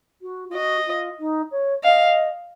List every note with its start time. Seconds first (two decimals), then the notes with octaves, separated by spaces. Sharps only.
0.21 F#4
0.49 F4
0.54 F#4 D#5
0.86 F4
1.19 D#4
1.51 C#5
1.83 D#5 F5